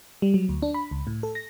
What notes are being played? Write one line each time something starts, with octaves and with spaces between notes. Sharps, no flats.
G3
F#3
D2
D4
B5
C#2
A2
A4
A#6